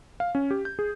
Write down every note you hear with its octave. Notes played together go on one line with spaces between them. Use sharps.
F5
C#4
G4
G6
G#4